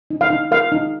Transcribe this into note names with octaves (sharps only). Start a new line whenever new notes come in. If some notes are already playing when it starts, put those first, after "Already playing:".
D#4
F5
D#4
A#4 F5
D#4